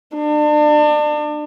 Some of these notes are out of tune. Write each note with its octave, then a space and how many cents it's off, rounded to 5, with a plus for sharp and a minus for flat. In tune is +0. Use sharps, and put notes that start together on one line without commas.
D4 +35